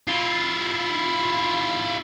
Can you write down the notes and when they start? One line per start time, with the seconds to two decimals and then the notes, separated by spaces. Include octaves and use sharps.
0.08 E4 F4